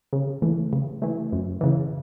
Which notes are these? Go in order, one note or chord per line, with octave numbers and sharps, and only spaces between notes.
C#3
E3 A3
C#3
E3 A3
F#2
C#3 E3